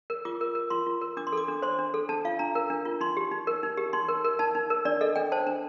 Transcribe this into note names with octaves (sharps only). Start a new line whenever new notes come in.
A#4
F4 D6
A#4
A#4
F4 C6
F4
A#4
D4 D6
C6
A4 D6
D4
C5 C6
D4
A4
D4 A5
F4 F5
D4 A#5
A#4
D4
F4
D#4 C6
G4
D#4
A#4
D#4
G4
D#4 C6
A#4
A#4
D#4 A5
D#4
A#4
D4 D5
A4 D#5
D4 G5
C5 A5
D4